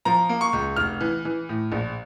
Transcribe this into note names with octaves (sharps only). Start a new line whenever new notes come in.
F3 A#5
A#3
C#6
C#2
F1 F6
E3
E3
A2
A#1